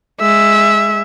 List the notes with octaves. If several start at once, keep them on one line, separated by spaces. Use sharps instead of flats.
G#3 E5